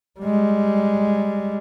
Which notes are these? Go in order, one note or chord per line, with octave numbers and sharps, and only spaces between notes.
G3 G#3